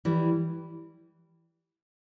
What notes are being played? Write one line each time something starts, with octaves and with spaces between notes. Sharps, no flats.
E3 G3